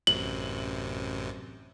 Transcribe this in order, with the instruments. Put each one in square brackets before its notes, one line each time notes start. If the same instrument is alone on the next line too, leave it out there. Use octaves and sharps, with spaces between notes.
[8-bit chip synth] A1 F#2 C3 [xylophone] F#7